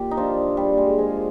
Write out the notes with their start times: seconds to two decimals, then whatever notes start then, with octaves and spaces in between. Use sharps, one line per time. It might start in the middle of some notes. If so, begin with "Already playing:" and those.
Already playing: A#2 G4
0.11 D#4
0.16 F3 D4 F4
0.57 A#2 G3
0.78 G#3
0.98 F3 G#3